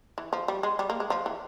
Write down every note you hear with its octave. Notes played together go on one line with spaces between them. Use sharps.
E3
F3
G3
G#3
G3
A#3
G#3
F3
E3